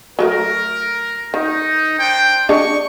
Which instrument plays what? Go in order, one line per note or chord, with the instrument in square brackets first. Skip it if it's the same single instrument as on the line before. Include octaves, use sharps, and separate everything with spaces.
[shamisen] F#3 G#3 A3 [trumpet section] A#4
[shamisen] D#3 [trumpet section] D#4
[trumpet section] D4 C5 G5
[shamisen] D4 G#4 D#5 [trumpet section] C#6